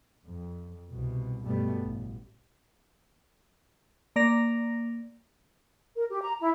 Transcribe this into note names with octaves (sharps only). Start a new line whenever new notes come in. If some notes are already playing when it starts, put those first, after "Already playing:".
F2
C2 B2
G2 B2 G3 A3 B3
A1
A#3 D5 A#6 F7
A#4
G4
A#5
E4